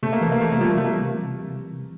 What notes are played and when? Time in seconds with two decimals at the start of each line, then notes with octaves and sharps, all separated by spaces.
0.03 C3 A3
0.13 A#3
0.21 E3 A3
0.32 A#3
0.40 C3 A3
0.52 A#3
0.58 F3 G3 A3
0.77 C3 F3 A3
0.85 A#3